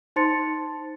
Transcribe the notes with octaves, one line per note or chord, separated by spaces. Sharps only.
D#4 C5 A5 C6 A6 C#7